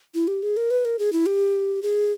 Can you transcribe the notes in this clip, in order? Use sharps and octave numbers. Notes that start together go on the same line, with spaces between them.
E4
G4
G#4
A#4
B4
A#4
G#4
E4
G4
G#4